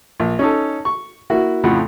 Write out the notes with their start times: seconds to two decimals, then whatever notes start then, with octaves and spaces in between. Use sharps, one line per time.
0.20 A#1
0.39 C#4 D#4 A4
0.85 C#6
1.30 A#3 E4 F#4
1.64 F2 A2 C#3 F3 F#5 B5